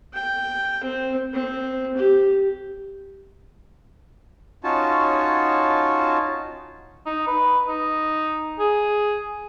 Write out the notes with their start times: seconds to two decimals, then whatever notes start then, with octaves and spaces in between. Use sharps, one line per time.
0.14 G5
0.84 C4
1.34 C4
1.97 G4
4.64 C#4 D#4 F4 F#4 C#5 A5
7.06 D#4
7.27 B4
7.68 D#4
8.60 G#4